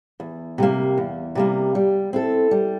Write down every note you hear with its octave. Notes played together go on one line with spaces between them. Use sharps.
E2
C3 G3 A#3
E2
C3 G3 A#3
G3
C4 E4 A4
G3